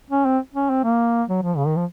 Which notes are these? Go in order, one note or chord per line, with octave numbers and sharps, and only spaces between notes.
C#4
C4
C#4
C4
A#3
F#3
F3
C#3
D#3
F3